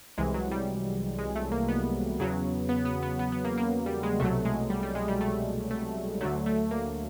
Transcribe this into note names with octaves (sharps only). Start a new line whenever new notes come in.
C2 C3 E3 G#3
F#3
G3
G#3
A3
A#3
B3
E2 C#3 F#3
B3
B3
B3
B3
B3
A#3
A#3
G3
G#3
C2 B2 F#3 A3
G#3
G3
G3
G#3
G3
A3
A3
D2 D3 F#3 A3
A3
A#3